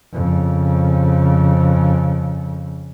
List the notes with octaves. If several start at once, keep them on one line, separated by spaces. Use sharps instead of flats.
F2 C#3